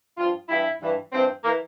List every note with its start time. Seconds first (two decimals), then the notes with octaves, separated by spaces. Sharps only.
0.18 G2 F3 F4
0.49 G2 E3 E4
0.80 G2 E3
1.12 G2 E3 C4
1.44 E3 A#3